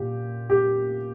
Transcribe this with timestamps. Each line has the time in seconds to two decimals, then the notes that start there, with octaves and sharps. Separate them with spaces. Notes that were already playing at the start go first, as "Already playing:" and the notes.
Already playing: A#2 G4
0.50 G4